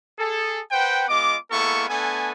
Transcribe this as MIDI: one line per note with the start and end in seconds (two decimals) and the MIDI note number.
0.19 0.61 68
0.19 0.61 69
0.71 1.04 71
0.71 1.04 72
0.71 1.04 78
0.71 1.04 79
1.08 1.36 56
1.08 1.36 59
1.08 1.36 65
1.08 1.36 75
1.08 1.36 86
1.51 1.86 56
1.51 1.86 58
1.51 1.86 59
1.51 1.86 64
1.51 1.86 69
1.51 1.86 85
1.89 2.32 57
1.89 2.32 59
1.89 2.32 62
1.89 2.32 69
1.89 2.32 80